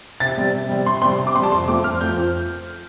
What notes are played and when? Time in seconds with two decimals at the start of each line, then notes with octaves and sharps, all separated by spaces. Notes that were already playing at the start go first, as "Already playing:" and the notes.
0.20 C3 A6
0.37 G3 C4
0.54 C3
0.69 G3 C4
0.86 C3 C6
1.02 G3 C4 C6
1.18 C3
1.27 D6
1.34 G3 C4 C6
1.43 A5
1.52 F2 C6
1.68 F3 A3 C4 D6
1.84 F2 F6
2.01 F3 A3 C4 G6
2.17 F2